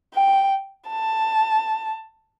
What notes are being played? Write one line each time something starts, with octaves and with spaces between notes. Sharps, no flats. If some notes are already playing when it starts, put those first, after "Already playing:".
G5
A5